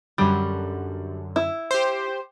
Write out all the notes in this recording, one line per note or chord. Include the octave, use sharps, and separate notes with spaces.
F#2 D3 G3
E4
G4 C5